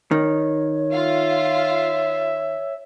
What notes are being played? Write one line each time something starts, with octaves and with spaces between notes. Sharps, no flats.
D#3 C#5
F4 E5 F5